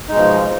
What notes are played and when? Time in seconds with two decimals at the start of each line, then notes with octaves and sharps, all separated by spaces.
0.08 D#4
0.11 G#3
0.14 B2
0.17 F3